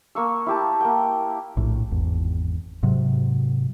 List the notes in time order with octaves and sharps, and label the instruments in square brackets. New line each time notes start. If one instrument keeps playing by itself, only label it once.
[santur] A#3 C#6 E6
E4 G4 A5
A#3 G5
[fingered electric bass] A#1 A2
G#1 E2
G#2 C3 F#3